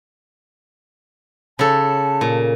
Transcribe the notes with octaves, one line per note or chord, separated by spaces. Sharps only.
C#3 A4 A5
A#2